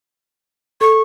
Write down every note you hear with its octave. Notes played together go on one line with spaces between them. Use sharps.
A4 C#6